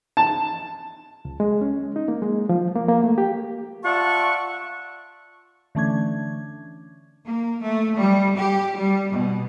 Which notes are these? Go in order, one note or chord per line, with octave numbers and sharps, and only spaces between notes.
A5
C#2
G#3
C#4
D#4
A#3
G#3
F3
A#3
A#3
A3
G4
F4 D5 E5 F#5 A5 C#6
D3 E3 A3 C#4 D4 G#6
A#3
A3
G3
G4
G3
B2